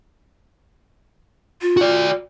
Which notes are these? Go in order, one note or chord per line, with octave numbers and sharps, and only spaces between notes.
F4
F#4 D5